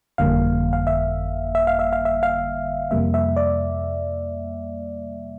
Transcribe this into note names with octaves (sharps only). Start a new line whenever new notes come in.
G1 F2 D3 G3 A#3 F5
F5
E5
E5
F5
E5
F5
E5
F5
F2 C3 G3 A#3 E5
E5
D5